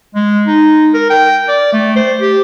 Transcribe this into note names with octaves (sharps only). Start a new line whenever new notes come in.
G#3
D#4
A#4
G5
D5
A3
C5
G4